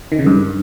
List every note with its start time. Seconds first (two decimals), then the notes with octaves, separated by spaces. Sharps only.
0.12 D#3
0.19 C#3
0.26 G2